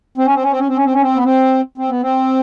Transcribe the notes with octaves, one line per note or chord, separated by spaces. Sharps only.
C4
C#4
C4
C#4
C4
C#4
C4
C#4
C4
C#4
C4
B3
C4
C4
B3
C4